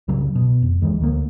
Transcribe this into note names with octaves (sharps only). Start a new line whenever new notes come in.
C2 C#3 F#3
B2
F1
D#2 D#3 E3 G#3
D2 A#3